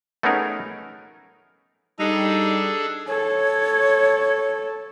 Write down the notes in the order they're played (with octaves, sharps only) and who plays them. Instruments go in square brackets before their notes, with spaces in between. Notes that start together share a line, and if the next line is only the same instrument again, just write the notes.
[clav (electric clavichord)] A3 B3 C#4 D#4 G#4 A#4
[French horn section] G3 [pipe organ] D4 G#4 A4 [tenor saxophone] D#4
[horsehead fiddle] A4 [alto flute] C#5